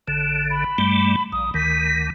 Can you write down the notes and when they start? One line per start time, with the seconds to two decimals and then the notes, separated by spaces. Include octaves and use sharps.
0.08 A1 D3 E7
0.50 B5
0.78 G2 G3 A3
1.32 A#1 D#6
1.54 D2 D#3 B6